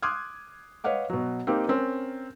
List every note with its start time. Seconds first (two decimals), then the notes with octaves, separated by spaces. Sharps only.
0.03 C6 D6 D#6 F6 F#6 G#6
0.84 B4 C#5 D#5 F5 F#5 D6
1.10 B2 F#3
1.47 A#3 C4 D#4 G4
1.68 C4 C#4 A#4